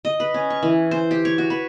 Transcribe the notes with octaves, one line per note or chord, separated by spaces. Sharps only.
D#5
B4
C#4
C#6
E3
C5
G4
C#5
F#4
B4